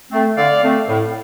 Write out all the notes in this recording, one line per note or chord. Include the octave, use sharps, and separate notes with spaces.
A3 C4
D3 D5 F5
A3 C4
A2